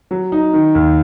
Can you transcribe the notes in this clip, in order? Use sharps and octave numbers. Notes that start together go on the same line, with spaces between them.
F#3
D#4
D#3
D#2